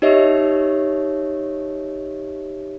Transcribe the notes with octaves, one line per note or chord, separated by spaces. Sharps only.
D#4 G4 C#5 D#5 E5